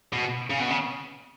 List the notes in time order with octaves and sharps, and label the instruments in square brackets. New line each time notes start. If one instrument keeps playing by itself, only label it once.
[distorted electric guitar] B2
C#3
B2
C#3